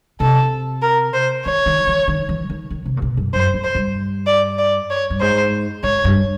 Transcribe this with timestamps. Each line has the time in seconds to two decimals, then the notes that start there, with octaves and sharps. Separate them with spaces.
0.20 C3 A4
0.82 A#4
1.14 C5
1.45 D#3 C#5
1.66 D#3
1.87 E3
2.07 D#3
2.29 E3
2.50 D#3
2.70 D#3
2.85 C3
2.97 A#2
3.02 B2
3.17 F#2
3.33 F#2 C5
3.54 F2
3.64 C5
3.75 G2
4.27 D5
4.59 D5
4.90 C#5
5.10 G2
5.21 G#2 C5
5.83 G#2 C#5
6.04 G2